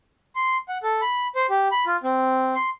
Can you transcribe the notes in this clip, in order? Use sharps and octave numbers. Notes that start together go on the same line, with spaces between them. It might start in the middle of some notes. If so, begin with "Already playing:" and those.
C6
F#5
A4
B5
C5
G4
B5
F4
C4
C6